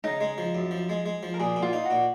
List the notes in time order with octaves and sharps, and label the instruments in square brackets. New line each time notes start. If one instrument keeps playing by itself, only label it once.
[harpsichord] C#3 [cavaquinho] D#4
[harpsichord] G#3
F3
F#2
F3
G#3
G#3
F3
[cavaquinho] A#4
[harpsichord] A#2 [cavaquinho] G#4
[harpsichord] A#2
[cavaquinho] F4
[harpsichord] D#4
[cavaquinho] F#4
[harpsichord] A#2